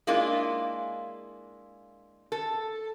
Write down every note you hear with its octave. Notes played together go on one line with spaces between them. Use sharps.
G#3 A#3 D4 E4 F4
A4